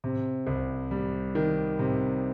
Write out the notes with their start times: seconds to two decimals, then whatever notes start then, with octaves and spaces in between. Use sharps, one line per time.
0.04 C3
0.47 C2
0.91 G3
1.35 D#3
1.79 C3